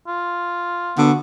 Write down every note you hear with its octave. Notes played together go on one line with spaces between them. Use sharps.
F4
D3 B3 F#4